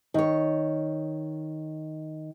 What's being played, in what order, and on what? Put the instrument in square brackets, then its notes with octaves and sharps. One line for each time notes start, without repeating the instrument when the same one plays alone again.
[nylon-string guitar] D#3 C#5